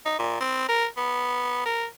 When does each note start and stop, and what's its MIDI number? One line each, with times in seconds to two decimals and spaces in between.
0.06 0.15 63
0.19 0.37 46
0.41 0.64 60
0.69 0.86 70
0.97 1.61 59
1.66 1.85 70